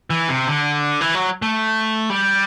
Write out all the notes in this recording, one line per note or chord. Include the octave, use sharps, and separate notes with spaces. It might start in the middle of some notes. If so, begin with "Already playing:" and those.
E3
C3
D3
E3
F#3
A3
G3